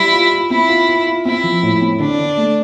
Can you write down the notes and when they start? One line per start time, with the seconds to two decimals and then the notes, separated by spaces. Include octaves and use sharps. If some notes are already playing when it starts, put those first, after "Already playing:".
Already playing: G3 E4
0.13 F4
0.32 F4
0.50 C4 E4
0.69 F4
0.88 F4
1.06 F4
1.25 C4 E4
1.44 F3
1.63 A2
1.81 C4
2.00 D3 D4
2.19 D3
2.37 A3